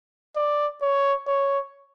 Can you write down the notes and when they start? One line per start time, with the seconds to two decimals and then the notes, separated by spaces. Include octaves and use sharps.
0.36 D5
0.82 C#5
1.27 C#5